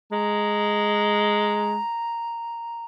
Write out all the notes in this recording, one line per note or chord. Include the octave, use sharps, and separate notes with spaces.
G#3 A#5